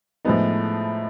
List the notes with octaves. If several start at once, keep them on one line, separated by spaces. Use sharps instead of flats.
A2 F3 G#3 B3 D#4